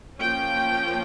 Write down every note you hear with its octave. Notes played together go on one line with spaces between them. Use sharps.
F3 A#3 C#4 G5